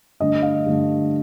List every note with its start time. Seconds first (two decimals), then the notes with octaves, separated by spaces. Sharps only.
0.20 G2 D3 A3 D#5
0.42 F5
0.66 G2 D3 A3